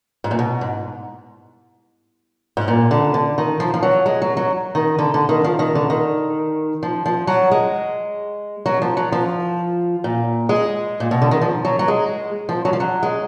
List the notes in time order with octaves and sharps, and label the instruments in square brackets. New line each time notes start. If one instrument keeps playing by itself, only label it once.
[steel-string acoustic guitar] G#2
A#2
B2
G#2
G#2
A#2
D3
D3
D#3
F3
F3
F#3
G#3
F#3
F#3
D#3
D3
D3
D#3
F3
D#3
D3
D#3
F3
F3
F#3
G#3
F#3
F3
F#3
F3
A#2
G#3
A#2
B2
D3
D#3
F3
F#3
F#3
G#3
F3
F#3
F3
F#3
G#3